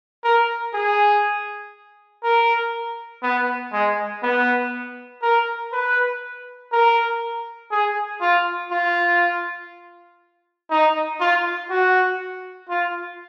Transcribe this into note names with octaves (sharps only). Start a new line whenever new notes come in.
A#4
G#4
A#4
B3
G#3
B3
A#4
B4
A#4
G#4
F4
F4
D#4
F4
F#4
F4